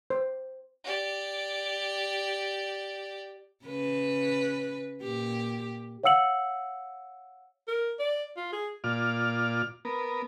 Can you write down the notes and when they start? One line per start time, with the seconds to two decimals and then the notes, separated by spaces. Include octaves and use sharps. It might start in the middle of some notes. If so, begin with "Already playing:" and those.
0.10 C5
0.84 G4 D5
3.65 C#3 B4
5.03 A#2 G4
6.04 C#5 F5 F#5 E6 C#7 F#7
7.68 A#4
7.99 D5
8.37 F4
8.53 G#4
8.84 A#2 F4 D5 F6
9.85 B3 A#4